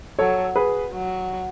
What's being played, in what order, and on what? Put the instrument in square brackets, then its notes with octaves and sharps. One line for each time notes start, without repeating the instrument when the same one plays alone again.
[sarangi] F#3 [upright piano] A4 C#5
[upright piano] G#4 B4
[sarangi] F#3